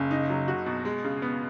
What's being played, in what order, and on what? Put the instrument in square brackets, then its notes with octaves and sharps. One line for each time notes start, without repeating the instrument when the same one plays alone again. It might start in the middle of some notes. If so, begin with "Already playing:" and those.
Already playing: [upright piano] F#1 [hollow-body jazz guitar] C#3
[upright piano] D#4
F#3
F#4
B2
G#3
C#3
B3